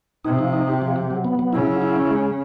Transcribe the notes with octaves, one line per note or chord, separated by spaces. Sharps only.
C3 D#4
F3
D#4
G4
F3
G4
F#3
B3
F#3
C#3 E4
F#3
E4
C#4
G#3